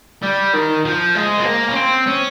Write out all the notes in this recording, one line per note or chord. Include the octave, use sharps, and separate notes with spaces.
G3
D#3
F3
G#3
C4
A#3
C#4
C4
C#4